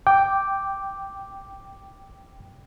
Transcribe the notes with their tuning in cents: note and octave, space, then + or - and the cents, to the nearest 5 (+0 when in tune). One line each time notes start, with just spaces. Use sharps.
G5 +0 D6 +0